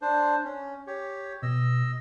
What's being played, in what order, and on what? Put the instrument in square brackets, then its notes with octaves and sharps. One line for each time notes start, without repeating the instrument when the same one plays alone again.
[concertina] D4 C5
C#4
G4 C#5
[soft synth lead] B2 [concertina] D#5 E6